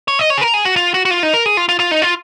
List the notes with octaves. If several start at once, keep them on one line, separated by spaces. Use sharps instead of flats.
C#5
D#5
C#5
G#4
A#4
G#4
F#4
F4
F#4
F#4
F4
D#4
A#4
G#4
F4
F4
F4
D#4
F4